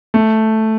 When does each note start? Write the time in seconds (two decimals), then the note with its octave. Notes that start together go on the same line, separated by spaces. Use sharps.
0.14 A3